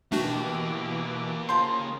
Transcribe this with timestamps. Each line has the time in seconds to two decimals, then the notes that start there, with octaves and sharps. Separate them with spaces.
0.12 B2 E3 A3 A#3 D4 F#4 G4 D6
1.49 C#3 F3 C5 C6